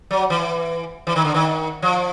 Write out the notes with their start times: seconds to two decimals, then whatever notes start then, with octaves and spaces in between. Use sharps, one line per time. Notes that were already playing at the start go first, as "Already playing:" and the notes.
0.11 F#3
0.30 E3
1.07 E3
1.16 D#3
1.25 D3
1.34 D#3
1.82 F3